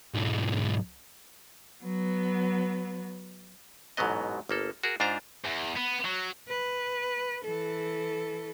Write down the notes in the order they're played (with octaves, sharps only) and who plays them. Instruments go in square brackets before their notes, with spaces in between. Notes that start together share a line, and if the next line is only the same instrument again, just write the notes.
[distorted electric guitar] B1 G#2
[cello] F#3 B3
[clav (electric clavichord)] A1 G#2 B2 F#3 B3 D#5
G1 A#3 A4
F#4 G#4 A#4
G#2 D4 F4 C5 A#5
[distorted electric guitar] E2
B3
F#3
[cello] B4
E3 A4